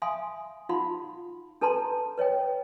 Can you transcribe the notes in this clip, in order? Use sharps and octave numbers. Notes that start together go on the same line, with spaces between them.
E5 F5 G#5 C6 D#6
D#4 F4 F5 F#5 B5 C6
D4 A4 B4 A5 A#5 C6
B4 C#5 D#5 G5